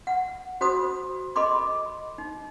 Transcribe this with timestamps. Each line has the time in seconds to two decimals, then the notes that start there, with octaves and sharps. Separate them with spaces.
0.07 F#5
0.61 F#4 C5 B5 D#6
1.36 A4 D#5 B5 C6 D6
2.18 D#4